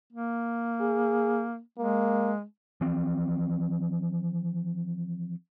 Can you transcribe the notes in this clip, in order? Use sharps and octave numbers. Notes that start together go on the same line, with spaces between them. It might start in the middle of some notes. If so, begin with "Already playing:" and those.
A#3
G#4
G#3 A#3
E3 F3 C4